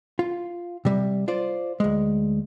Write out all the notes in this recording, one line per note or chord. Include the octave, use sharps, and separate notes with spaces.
F4
C3 G3
F4 C5 D5
D2 G#3